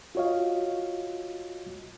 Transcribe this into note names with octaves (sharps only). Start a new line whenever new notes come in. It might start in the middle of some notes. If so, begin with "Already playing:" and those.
F4 F#4 C#5 D#5 F5